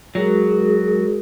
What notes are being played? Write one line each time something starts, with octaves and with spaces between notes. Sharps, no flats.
F#3 G#3 F#4 G#4 A#4